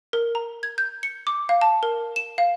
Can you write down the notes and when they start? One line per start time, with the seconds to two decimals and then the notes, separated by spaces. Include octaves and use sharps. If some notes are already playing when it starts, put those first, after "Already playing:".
0.13 A#4
0.35 A#5
0.63 G#6
0.78 G6
1.03 C#7
1.27 D6
1.49 F5
1.61 A5
1.83 A#4
2.16 E7
2.38 F5